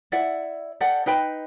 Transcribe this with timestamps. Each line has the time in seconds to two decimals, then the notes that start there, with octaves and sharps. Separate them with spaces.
0.12 E4 D5 E5 F#5
0.81 G4 A4 D5 F#5
1.06 D#4 B4 G5 B5